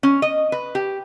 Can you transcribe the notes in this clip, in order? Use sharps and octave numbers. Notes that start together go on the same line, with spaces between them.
C#4
D#5
B4
G4